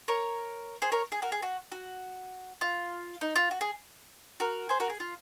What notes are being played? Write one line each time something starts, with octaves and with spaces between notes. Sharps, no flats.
A#4 C#5
G#4 C5
A#4 C#5
G#4
F#4 A#4
G#4
F#4
F#4
F4
D#4
F4
F#4
G#4
F#4 A#4
G#4 C5
F#4 A#4
G#4
F4